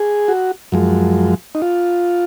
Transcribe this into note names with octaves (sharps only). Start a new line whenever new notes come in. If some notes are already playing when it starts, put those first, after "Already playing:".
Already playing: G#4
F#4
F#2 F3 G#3
D#4
F4